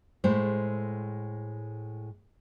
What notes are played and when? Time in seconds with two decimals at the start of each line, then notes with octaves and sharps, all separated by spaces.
0.24 A2 G#3 A3 C5